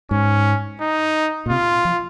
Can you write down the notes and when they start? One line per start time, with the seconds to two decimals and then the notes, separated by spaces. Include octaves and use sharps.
0.11 G#2 C#4
0.81 D#4
1.46 A#2
1.49 C3 F4
1.85 F3